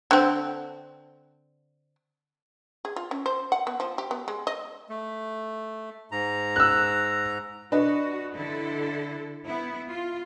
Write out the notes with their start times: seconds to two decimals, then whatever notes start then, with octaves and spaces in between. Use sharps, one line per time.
0.11 D3 C4
2.85 G#4
2.96 F4
3.11 C#4
3.26 C5
3.52 F#5
3.67 B3
3.80 F3
3.98 G4
4.11 B3
4.28 G#3
4.47 D#5
4.89 A3
6.12 G#2 A#5
6.56 E6 F#6
7.72 D4 F#4 B4 D#5
8.34 D3 E4 A4
9.45 B3 E4
9.88 F4